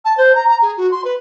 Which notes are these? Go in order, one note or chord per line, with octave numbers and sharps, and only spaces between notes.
A5
C5
A#5
A#5
G#4
F#4
C6
B4